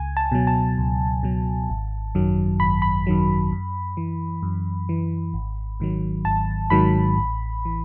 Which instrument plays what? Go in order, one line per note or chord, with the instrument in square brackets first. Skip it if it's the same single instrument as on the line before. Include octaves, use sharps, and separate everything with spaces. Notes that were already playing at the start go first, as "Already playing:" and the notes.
Already playing: [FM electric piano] C#2 G#5
A5
B2 F#3
A5
C#2
B2 F#3
G#1
F#2 D#3 F#3
G#1 B5
B5
F#2 D#3 F#3
F#2
E3
F#2
E3
G#1
G#2 D#3 F#3
G#1 A5
G#2 D#3 F#3 B5
A1
E3